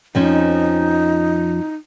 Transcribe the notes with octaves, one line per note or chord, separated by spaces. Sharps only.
F2 F3 C#4 D#4